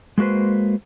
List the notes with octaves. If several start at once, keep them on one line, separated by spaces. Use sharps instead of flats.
G#3 A#3 F#4 B4 C5